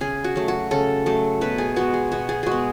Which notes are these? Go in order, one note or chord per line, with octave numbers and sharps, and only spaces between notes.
C#3 G#4
F#4
F#3 A3
F#4
C#3 A4
F#3 A3
B2 B4
G#4
G#3 B3 F#4
G#4
B2 F#4
G#4
G#3 F#4 G#4
B3